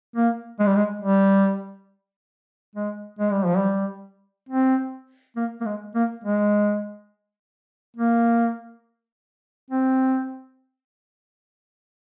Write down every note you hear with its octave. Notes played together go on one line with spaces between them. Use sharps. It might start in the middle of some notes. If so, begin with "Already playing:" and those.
A#3
G#3
G3
G#3
G3
G#3
G#3
G3
F3
G3
C4
A#3
A#3
G#3
A#3
G#3
A#3
C4